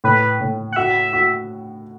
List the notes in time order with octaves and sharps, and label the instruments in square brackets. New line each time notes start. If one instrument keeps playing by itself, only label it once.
[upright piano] A2 [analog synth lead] B4
[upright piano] A2
[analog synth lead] F#5
[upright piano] F#4 [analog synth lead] E5
[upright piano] F#4